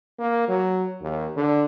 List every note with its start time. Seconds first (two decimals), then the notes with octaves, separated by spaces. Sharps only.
0.19 A#3
0.48 F#3
1.01 D#2
1.36 D3